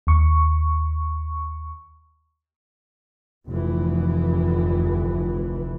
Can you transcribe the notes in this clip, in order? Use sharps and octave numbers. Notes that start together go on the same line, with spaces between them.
D#2 C#6
F1 D2 E3